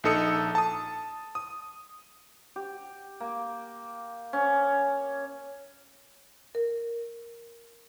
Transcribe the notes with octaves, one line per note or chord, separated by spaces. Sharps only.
A#1 D#4 A4 D#6 C#7
A5 D#6
D#6
G4
A#3
C#4
A#4